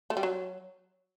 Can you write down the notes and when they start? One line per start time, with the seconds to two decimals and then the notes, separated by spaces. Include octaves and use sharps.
0.10 A3
0.17 G3
0.23 F#3